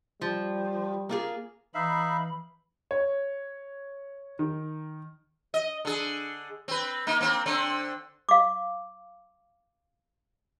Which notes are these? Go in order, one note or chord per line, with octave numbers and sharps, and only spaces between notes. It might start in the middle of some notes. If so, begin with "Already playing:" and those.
F3 G3
A#3 F4 G#4
E3 D#4 E5 F5 B5
C#5
D#3
D#5
D3 G#4
C4 B4
A#3 D#4
A#3 C4
D3 C4
F5 D6